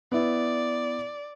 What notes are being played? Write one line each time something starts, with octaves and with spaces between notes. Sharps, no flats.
B3 E4 D5